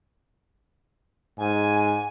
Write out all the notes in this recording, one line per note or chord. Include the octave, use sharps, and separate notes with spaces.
G#2 G#5